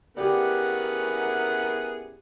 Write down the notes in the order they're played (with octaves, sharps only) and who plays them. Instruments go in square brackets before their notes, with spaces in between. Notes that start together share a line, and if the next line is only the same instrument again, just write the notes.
[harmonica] B3 G#4 A#4 [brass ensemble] C#4 E4 F#5 [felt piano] G4 D5